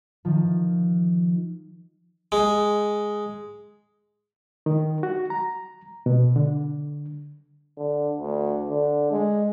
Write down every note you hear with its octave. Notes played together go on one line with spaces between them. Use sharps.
D#3 F3
G#3
D#3
F#4
A#5
B2
D3
D3
D2
D3
G#3